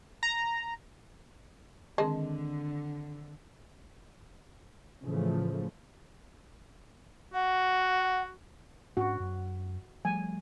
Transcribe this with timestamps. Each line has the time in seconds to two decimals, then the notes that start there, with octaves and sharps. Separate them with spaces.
0.23 A#5
1.98 D3 D#3 G#3 C4 A#4 D#5 A5
5.02 A2 C#3 E3 F3 A3
7.34 F#4 F#5
8.97 G#2 C#4 D4 F#4
9.20 F#2
10.05 F3 G3 A3 G#5